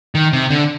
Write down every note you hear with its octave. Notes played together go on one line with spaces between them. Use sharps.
D#3
C3
D3